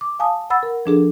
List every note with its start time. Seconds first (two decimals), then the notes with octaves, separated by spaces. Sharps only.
0.01 D6
0.19 F5 G#5 A5 D#6
0.50 F#5 B5 E6 A6
0.63 A#4
0.86 F3 D4 G#4 A4